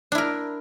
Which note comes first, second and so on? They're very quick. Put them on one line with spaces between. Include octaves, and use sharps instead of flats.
D4 E4 A#4